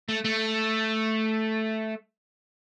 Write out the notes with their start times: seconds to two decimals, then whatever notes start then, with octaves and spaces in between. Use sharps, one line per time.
0.09 A3
0.25 A3